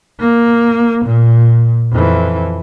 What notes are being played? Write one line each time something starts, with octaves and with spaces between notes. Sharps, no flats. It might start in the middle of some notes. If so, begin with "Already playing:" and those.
A#3
A#2
F2 E3